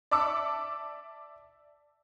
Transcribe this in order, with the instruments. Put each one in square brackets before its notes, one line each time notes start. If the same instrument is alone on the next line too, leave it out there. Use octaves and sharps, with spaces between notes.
[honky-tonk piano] D5 E5 A5 D6 E6 C#7